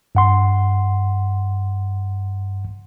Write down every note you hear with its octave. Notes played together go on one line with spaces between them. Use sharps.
G2 F#5 C6